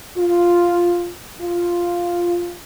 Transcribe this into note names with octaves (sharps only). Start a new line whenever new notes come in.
F4
F4